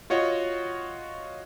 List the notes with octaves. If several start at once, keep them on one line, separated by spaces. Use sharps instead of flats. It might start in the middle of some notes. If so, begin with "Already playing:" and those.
F4 F#4 C#5 D#5